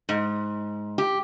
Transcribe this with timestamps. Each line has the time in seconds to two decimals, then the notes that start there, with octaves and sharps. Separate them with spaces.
0.09 G#2
0.98 G4